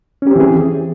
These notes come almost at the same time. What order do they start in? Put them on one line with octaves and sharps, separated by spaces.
C#4 G4 C4 E3 G#4